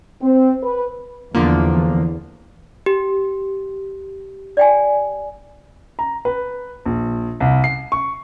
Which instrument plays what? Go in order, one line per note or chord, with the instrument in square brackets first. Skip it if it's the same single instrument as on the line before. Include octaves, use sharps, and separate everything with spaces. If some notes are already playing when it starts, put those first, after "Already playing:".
[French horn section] C4
B4
[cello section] E2 [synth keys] D3 F3 A#3
[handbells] G4
[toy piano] D5 G5 G#5
[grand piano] A#5
B4
A#1
C2
C7
C#6